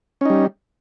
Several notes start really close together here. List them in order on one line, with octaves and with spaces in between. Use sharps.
C#4 D#4 G3